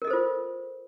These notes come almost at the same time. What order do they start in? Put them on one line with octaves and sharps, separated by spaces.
A#4 D#5 A4 C5 F4